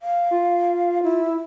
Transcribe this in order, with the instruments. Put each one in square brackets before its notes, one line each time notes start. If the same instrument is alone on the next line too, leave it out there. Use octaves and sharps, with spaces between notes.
[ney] F5
[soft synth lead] F4
[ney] E4